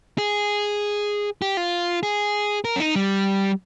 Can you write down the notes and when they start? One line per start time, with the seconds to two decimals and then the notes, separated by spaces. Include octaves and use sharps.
0.18 G#4
1.42 G4
1.57 F4
2.03 G#4
2.65 A#4
2.76 C#4
2.80 D#4
2.96 G3